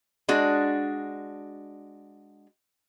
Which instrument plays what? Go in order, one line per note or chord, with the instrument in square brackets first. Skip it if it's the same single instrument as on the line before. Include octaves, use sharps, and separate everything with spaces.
[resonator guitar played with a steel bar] G#3 D4 F#4